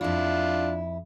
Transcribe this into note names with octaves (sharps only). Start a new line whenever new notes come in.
F2 D4 E4 F4